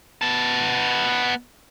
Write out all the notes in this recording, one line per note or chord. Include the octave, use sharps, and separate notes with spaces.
B3 A5